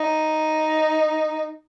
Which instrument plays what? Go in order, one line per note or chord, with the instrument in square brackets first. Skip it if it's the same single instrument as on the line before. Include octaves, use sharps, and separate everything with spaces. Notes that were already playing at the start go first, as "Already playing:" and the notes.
Already playing: [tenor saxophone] D#4